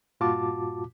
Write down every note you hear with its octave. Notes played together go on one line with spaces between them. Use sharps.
G2 A#2 F4 F#4 A5 D6